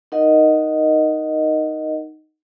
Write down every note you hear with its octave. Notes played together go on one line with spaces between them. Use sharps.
D#4 A#4 D#5 F#5